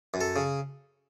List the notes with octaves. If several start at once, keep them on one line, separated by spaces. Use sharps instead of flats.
F#2
A4
C#3